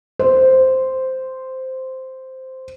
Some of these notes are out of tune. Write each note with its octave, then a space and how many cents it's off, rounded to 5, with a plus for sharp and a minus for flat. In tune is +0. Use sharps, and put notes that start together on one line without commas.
C5 -5